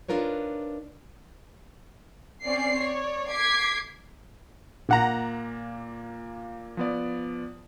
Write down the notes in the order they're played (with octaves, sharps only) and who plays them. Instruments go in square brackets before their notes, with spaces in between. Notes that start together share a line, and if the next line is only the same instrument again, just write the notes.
[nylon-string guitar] D4 D#4 F4 A#4 B4 C#5
[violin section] C4 C#4 D5 C7
C#5 D5
D6 G#6 B6 C7
[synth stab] A#1 F#5 A#5 [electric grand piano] A#2 A#3
[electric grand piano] F3 B3 D5